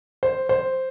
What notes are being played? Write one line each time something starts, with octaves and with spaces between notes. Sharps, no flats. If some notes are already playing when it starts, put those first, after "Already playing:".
C5
C5